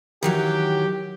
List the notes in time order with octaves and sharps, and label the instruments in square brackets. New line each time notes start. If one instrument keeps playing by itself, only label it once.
[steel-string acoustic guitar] D#3 E3 F#3 [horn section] G4